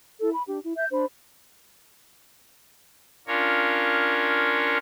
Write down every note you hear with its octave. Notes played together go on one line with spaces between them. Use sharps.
E4 A4
B5
D4 G4
E4
E5 G6
D4 C5 B5
C#4 D4 F4 A#4 C#5